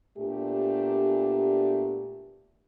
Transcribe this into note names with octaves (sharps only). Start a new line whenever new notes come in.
A#2 A3 B3 D4 G4